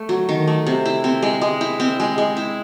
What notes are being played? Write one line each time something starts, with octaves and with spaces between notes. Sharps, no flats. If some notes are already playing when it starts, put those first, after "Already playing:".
Already playing: A3
F#3
D#3
A3
C3
E4
C4
G#3
G#3
E4
C4
G#3
G#3
E4